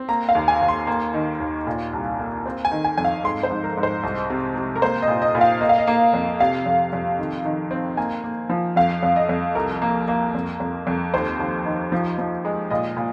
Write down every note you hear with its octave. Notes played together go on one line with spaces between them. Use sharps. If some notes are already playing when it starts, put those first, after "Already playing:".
Already playing: C4
A#3 A#5
F5
D#2
G#5
D#2
C6
A#3
D#3
D#2
A#2
C2
A#3
C4
G#5
D#3
G#5
F2 G#5
F5
G#2 C6
C5
G#2
A#4
G#2
C5
C2
C3
C3
A#4
A#3 C5
D#5
A#2
D#5
A#2
F5
A#3 D#5
F5
D#5
A#3
F2
C3 F5
F2
F2
D#3
D#3
C4
A#3 G#5
A#3
F3
F2 F5
F2
D#5
F2
C2 A#4
A#3
A#3
F2
F2
F2
D#2 C5
D#2
D#3
F3
F3
G#3
A#2 D#5
A#2